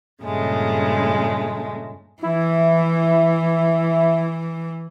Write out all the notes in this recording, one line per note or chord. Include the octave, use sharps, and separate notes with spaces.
G2 A#2 C#3 G#3 A3
E3 E4